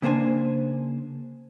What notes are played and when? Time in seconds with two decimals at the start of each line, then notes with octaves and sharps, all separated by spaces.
0.02 C#3 A#3 D4 C5 G#5